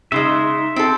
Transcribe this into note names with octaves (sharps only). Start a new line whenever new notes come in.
C#3 G#3 D#4 E5 C6
C4 A4